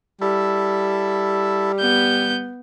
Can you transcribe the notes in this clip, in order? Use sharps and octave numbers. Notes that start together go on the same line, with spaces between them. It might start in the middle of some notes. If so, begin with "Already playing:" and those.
G3 E4 A4
B3 G6